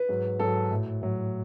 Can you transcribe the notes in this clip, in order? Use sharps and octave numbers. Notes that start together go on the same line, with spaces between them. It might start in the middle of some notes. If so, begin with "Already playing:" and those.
Already playing: B4
G#2 F#3
G#2 F#3 A4
A2 F#3
A2 F#3